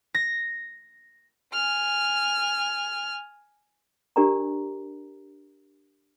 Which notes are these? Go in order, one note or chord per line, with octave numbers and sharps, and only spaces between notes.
A#6
G#5 F6
D4 G4 A#4 D5 G#5 A#5